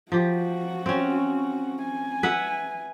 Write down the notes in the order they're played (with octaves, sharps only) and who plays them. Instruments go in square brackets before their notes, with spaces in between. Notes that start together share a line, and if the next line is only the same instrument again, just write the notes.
[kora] F3 G4 [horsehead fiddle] F#4
[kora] C4 C#4
[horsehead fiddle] G#5
[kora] B4 E5 F#5